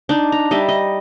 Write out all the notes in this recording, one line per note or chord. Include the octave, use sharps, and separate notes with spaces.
D4 D#4
A#5
G3 D#5 E5
D#5